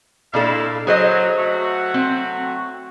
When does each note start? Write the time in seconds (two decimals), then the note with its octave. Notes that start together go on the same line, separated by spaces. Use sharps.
0.34 A#2 D4 E4 A4 D#5 F5
0.87 F#3 G#4 C5 D#5
1.39 F#3 A3 F#4
1.94 C4